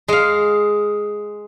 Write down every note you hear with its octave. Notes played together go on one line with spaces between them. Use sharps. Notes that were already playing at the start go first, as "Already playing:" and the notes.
G#3 F5